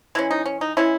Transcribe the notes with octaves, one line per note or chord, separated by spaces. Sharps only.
E3 G#3 C#4 E4
D#4
C#4
D#4
E3 G#3 C#4 E4